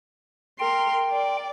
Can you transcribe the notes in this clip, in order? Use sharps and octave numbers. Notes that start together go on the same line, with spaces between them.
A#4 G5 C6
D5